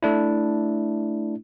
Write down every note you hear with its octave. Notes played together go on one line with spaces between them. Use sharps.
A3 D4 E4